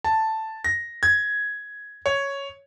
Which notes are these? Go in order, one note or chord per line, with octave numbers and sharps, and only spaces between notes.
A5
A#6
G#6
C#5